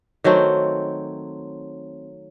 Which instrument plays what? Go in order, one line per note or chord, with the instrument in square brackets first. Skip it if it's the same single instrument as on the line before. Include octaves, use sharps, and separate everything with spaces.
[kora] D#3 F#3 A3 C4